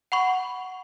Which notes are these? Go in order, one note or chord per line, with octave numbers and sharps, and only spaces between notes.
F#5 B5 C#6